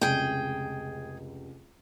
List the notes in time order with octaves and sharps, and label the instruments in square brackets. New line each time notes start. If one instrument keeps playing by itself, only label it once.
[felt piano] F1 C#2 [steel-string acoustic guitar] G#4 G5